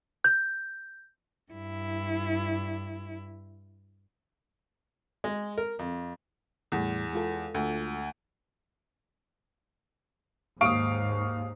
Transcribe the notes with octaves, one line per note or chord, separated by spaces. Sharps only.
G6
G2 E4
G#3
A#4
F2
E2 A2 G3 A3
G#3 F4 A4
D2
D#2 G#2 F5 C#6 D#6 D7